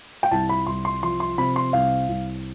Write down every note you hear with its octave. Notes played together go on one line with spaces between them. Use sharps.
G5
C2 A5
B5
C2 C6
C6
F3 C6
C6
C3 B5
C6
C2 F5
C2